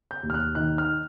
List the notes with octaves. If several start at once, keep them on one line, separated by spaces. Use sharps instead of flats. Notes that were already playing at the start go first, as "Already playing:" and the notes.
G6
D#2
F6
F#6
D#3 F#6
F6